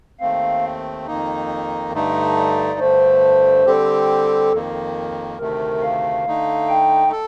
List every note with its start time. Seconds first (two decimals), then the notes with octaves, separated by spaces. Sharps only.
0.20 D#2 D#3 A3 C4 F5
1.07 F2 D#3 A#3 D#4
1.93 G2 D3 A3 D#4
2.36 D5
2.79 G2 D3 A3 C5
3.66 D3 G3 C4 G4 A4
4.52 F2 D#3 A#3
5.39 D2 C3 D#3 A3 A#4
5.82 F5
6.26 D3 A3 D#4
6.69 G5
7.12 A4